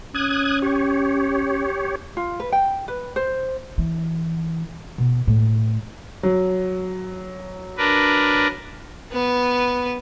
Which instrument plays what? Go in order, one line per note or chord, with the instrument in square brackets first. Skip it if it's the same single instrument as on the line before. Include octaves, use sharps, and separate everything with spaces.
[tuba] C#4 [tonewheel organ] D#6 F#6 G#6
[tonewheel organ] G4 C#5
[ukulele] F4
B4
G5
B4
C5
[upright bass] E3
B2
A2
[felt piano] F#3
[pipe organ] D4 A#4 B4
[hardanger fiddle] B3 B4